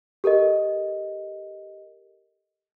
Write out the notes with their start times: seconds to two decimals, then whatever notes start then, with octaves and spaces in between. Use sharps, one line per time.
0.24 G4 A4 A#4 D#5